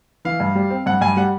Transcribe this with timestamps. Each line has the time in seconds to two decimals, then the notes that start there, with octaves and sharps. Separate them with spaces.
0.25 E3 F5
0.40 G2
0.55 G3
0.70 C4
0.86 G2 F#5
1.01 G2 G#5
1.17 G3 F#5